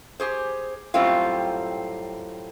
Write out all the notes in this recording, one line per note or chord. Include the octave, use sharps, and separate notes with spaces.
G4 G#4 C5
F#2 A2 G3 C4 F4